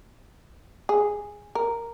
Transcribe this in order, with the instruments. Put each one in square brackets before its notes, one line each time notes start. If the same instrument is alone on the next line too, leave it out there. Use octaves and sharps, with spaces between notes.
[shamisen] G#4
A#4